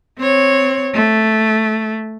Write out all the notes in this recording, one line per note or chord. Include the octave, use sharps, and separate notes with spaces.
C4 C#5
A3